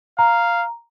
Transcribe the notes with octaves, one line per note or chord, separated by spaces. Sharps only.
F5 A#5